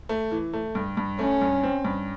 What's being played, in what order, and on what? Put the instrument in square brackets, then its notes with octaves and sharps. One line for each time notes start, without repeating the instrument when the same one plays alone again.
[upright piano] A3
E3
A3
G2
G2
[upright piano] A3 [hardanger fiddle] C#4
[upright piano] G2
C4
G2